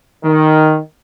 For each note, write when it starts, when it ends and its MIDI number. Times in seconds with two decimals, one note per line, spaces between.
0.24 0.78 51